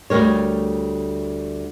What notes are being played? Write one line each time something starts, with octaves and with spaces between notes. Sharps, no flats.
D2 G#2 G3 A#4 C#5